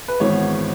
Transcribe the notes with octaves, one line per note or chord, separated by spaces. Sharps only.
B4
G#1 G#2 E3 B3 C#5